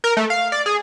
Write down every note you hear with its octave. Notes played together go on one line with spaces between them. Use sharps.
A#4
A3
F5
D5
G#4